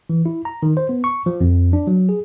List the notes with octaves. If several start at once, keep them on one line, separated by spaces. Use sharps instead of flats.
E3
E4
A#5
D#3
C5
B3
C#6
F3
F2
D4
F#3
G#4